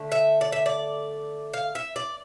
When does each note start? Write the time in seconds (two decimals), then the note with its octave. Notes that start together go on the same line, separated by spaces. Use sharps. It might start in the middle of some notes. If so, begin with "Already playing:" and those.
Already playing: D3 A3
0.12 E5
0.41 D5
0.52 E5
0.66 D5
1.54 F5
1.75 E5
1.96 D5